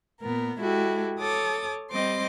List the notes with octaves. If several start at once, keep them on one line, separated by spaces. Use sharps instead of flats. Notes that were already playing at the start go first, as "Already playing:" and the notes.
A#2 B3 A#4
G#3 E4 F#4 G4 A4
A4 C#5 D6 D#6
G3 C4 D#5 C6 D6